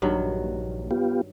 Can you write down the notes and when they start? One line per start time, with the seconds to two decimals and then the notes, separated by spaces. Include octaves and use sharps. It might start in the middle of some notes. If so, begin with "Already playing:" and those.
0.02 A#1 G2 D#3 F#3
0.91 B3 F4 G4